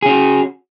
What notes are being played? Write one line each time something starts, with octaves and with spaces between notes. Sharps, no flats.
C#4 F#4 G#4